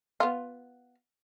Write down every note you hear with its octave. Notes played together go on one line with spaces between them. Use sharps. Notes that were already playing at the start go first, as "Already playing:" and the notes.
B3 F4